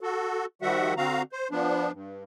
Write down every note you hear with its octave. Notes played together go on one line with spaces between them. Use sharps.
F#4 A4
D#3 F3 G3 F#4 E5 F#5
D3 C4 F#4 F5 A#5
C5
F3 B3 D4
G2